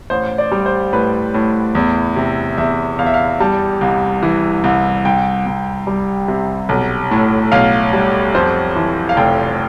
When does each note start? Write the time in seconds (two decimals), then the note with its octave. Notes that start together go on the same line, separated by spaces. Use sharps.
0.10 A1 C5
0.38 D5
0.52 G3
0.66 C5
0.93 A2 B4
1.34 A2
1.75 E2
2.16 C3
2.58 E2 E5
2.99 E2 F5
3.06 E5
3.14 F5
3.40 G3 A5
3.81 C2
4.23 E3
4.64 C2
5.05 C2 G5
5.46 C2
5.87 G3
6.28 C3
6.69 B1
7.11 A2
7.52 B1 F5
7.93 G3
8.35 F2 C5
8.76 E3
9.09 F5
9.17 F1 G5